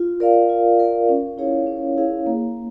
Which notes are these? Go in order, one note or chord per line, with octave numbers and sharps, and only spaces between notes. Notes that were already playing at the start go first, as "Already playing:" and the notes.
Already playing: F4
A#4 D5 F5
F4
A#4 D5 F5
C#4
E4 G#4 C#5 F5
C#4
E4 G#4 C#5 F5
A#3